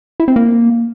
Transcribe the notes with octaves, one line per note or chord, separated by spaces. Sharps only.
E4
C4
A#3